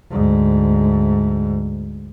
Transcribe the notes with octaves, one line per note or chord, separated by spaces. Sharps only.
D2 G#2